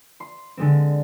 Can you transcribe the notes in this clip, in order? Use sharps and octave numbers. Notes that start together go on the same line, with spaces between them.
C6
D3 G#3 C4